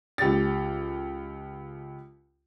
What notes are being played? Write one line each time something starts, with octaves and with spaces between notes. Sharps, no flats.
C#2 G4 A6